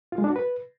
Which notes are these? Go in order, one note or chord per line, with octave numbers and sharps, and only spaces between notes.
F4
G#3
D4
F#4
B4